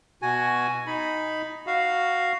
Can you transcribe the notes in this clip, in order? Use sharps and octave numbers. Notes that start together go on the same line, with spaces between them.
B2 F#4 G#5
D#4 B5
F#4 F5